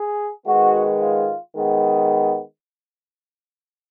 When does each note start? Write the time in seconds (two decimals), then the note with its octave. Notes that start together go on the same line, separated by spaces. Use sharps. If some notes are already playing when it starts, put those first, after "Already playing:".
Already playing: G#4
0.46 D#3 G#3 B3 F#4
1.00 F4
1.53 D#3 G#3 B3